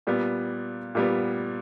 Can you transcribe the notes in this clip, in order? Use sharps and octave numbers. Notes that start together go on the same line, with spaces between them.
A#2 G3 B3
A#2 G3 B3